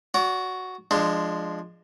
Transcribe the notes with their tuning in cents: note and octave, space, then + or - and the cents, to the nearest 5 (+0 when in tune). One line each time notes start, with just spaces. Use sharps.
F#4 +0 D5 -40
F3 -5 G#3 +0 D4 +20